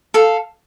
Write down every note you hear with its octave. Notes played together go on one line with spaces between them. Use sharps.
A4 F5